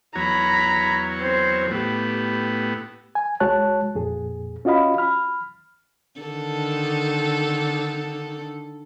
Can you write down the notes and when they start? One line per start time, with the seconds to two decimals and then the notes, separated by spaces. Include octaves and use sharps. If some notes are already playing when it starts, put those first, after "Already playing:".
0.15 E2 F#3 C#5 A#5 B5
1.19 C4 C5
1.71 A2 B3 G4
3.15 G#5
3.40 C2 G#3 F#4 C#5 A5 F#6
3.95 F2 A#2 G#4
4.65 C#4 F4 F#4 D#5 F5 B5
4.98 B5 F6
6.20 D3 D#3 A4